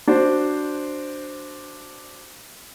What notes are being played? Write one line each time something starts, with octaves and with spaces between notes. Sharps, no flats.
D4 F#4 C5